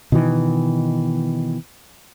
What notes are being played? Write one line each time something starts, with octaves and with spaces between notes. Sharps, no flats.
B2 D#3 E3